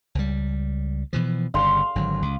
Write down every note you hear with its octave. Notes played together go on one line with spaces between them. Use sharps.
C#2 G3
B2 E3 F3
G1 C#3 F5 C6
G#1 D3 F#3
C#2